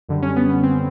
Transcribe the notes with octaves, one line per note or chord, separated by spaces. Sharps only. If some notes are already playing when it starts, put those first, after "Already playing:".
F#2 D3 G3
C#4
B3
B3
C4